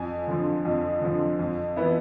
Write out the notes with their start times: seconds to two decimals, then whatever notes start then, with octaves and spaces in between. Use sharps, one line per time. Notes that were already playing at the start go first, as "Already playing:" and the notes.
Already playing: F2 G#5
0.27 D3 F3
0.65 F2
1.02 D3 F3
1.39 F2
1.76 E3 B3 E4